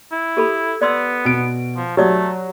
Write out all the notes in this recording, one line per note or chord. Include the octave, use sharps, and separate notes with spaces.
E4
G4 A4 B5
B3 D5 C6 E6
B2 D7
F3
F#3 A3 G4 D5 D#6